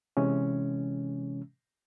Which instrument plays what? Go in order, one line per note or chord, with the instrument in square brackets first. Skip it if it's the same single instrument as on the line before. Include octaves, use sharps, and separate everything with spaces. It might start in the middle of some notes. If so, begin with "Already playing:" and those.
[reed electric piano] C3 E3 G#3 C#4